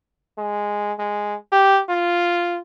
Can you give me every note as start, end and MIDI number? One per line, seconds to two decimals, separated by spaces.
0.38 0.93 56
0.99 1.35 56
1.52 1.81 67
1.89 2.60 65